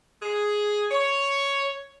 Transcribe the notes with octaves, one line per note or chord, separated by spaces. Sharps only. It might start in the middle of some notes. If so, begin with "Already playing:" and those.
G#4
C#5